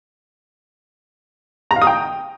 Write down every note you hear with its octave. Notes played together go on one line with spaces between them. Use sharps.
A#5
F5
D#6
G5